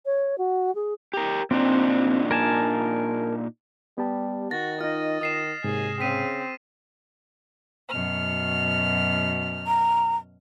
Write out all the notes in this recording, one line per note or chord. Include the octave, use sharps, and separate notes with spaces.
C#5
F#4
G#4
G4 A#4
A#2 C4 D4 D#4
A#4 G#5 A5
G3 B3 G4 A5
D#3 F#4 A6 A#6
D#4 F4 D#5 F6
D#3 D#6 C7 E7
D#2 G#2 C3 G#4
C#3 C4 B6 D#7
F#2 B2 F6
A#5